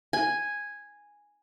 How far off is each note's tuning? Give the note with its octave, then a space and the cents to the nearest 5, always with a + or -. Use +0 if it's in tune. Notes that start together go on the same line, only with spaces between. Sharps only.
G#5 -5